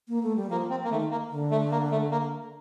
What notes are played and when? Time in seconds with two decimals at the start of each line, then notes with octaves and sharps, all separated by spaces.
0.08 A#3
0.23 A3
0.36 G3
0.50 F3 A#3
0.70 C4
0.84 A#3
0.90 D#3 A3
1.11 A#3
1.31 D3
1.51 A3
1.71 A#3
1.91 A3
2.11 A#3